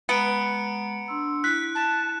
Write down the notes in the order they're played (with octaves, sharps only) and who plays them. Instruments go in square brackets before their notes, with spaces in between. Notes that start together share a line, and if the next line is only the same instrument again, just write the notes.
[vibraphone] G#3 A#5 [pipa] B3 [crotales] C#7 D7
[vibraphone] D4 C6 E6
[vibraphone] E4 [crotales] F#6 [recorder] B6
[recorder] A5